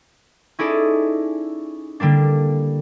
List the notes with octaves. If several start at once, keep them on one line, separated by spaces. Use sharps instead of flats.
C#4 D#4 E4 G#4 A4 D5
D3 G3 A#3 D4